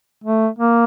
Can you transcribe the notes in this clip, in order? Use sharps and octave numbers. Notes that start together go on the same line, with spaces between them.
A3
A#3